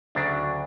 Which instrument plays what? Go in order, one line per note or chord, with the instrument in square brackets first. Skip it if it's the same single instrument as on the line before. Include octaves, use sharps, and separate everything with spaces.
[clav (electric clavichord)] D2 C#3 F#3 D4